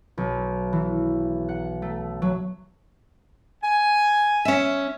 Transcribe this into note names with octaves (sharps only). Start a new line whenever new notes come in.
B1
E3
F#5
A3
F#3
G#5
C#4 E5